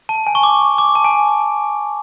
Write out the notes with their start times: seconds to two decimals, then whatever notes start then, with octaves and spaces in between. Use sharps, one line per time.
0.09 A5
0.27 G#5
0.35 C#6
0.43 D6
0.78 D6
0.95 A5
1.04 G#5